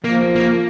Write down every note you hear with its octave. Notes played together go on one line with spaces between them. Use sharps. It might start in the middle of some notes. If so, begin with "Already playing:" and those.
F3 A#3
A#3